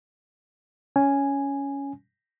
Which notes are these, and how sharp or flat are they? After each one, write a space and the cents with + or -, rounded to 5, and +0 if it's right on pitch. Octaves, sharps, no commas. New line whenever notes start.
C#4 +10 G#5 +0